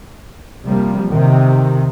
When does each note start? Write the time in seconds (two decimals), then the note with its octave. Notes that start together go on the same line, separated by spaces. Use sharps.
0.65 C3 F3 G3 A#3
1.10 C3 D#3